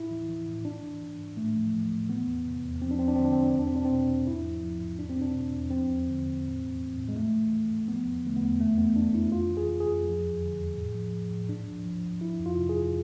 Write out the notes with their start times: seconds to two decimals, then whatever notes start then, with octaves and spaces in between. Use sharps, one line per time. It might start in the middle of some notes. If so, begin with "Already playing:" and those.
Already playing: A2 E4
0.11 E3
0.29 E3
0.47 A2
0.65 G#2 D4
0.83 E3
1.02 E3
1.19 G#2
1.37 A2 A3
1.55 F3
1.73 F3
1.91 A2
2.09 E3 B3
2.27 E2
2.46 C3
2.63 E2
2.82 F3 C4
2.91 D4
2.99 E2 C4
3.08 D4
3.16 D3 C4
3.25 D4
3.33 C4
3.36 E2
3.42 D4
3.50 C4
3.54 E2 D4
3.67 C4
3.72 B2 D4
3.85 C4
3.91 B2
4.09 E2
4.27 G#2 E4
4.45 F3
4.63 F3
4.80 G#2
4.99 E2 D4
5.10 C4
5.17 B2 D4
5.34 B2
5.53 E2
5.70 F3 C4
5.89 E2
6.08 D3
6.25 E2
6.43 A2
6.61 E3
6.79 E3
6.98 A2
7.09 G#3
7.15 G#2 A3
7.34 E3
7.52 E3
7.70 G#2
7.88 F3 B3
8.05 E2
8.24 D3 A3
8.37 E2 B3
8.60 F2 A3
8.78 E3 B3
8.96 E3 D4
9.14 F2 E4
9.32 F2 F4
9.50 E3
9.57 G#4
9.68 E3
9.80 G#4
9.86 F2
10.05 F3
10.23 E2
10.41 D3
10.58 E2
10.77 A2
10.95 F3
11.13 F3
11.31 A2
11.49 G#2 D4
11.68 F3
11.85 F3
12.04 G#2
12.21 F3 E4
12.40 F2
12.46 F4
12.57 C3
12.69 G#4
12.75 F2